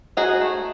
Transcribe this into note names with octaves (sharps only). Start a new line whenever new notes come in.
D#4 F#4 G#4
A3